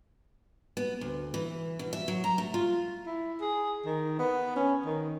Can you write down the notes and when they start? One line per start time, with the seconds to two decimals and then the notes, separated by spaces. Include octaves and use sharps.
0.77 B3
1.01 D2
1.34 E3
1.79 B2
1.93 E5
2.08 F#3
2.24 A#5
2.38 A3
2.54 F4
3.06 E4
3.41 G#4
3.85 D#3
4.19 B3
4.56 C#4
4.85 D#3